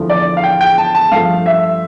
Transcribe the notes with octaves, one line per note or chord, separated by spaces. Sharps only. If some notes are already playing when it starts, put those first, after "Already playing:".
Already playing: E2 D3 F3 A3
D5
F5
G5
G5
A5
A5
G2 F3 A3 F5
E5